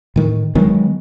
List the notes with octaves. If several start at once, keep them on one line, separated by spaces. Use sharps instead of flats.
A2 D#3
D#3 F#3 G#3 B3